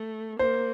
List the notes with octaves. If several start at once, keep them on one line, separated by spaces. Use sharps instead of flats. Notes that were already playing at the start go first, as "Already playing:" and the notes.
Already playing: A3
A#3 C5